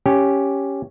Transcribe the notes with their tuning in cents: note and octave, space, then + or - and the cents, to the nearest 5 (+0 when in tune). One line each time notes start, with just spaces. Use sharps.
C#4 +0 G4 +0